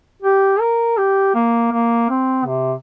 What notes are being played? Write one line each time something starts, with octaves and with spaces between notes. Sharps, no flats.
G4
A#4
G4
A#3
A#3
C4
C3